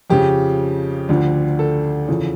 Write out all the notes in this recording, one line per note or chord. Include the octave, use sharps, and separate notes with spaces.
F2 C#3 F3 G4
D2 D3 F3
A4
E2 C#3 F3